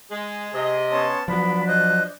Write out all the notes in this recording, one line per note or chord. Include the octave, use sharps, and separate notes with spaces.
G#3 G#4
C3 D#5
B3 C#4 C#5 A5 C6
F3 F#3 B3 D4 B5
C5 D#5 F#6